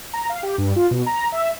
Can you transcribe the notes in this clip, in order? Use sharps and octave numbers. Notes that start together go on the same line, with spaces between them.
A#5
F5
G4
G2
F4
B2
A#5
E5